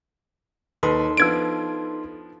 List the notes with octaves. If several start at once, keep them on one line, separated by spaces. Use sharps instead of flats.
D#2 D#4 A4 B4 C6
F3 B3 D4 E6 G#6 D7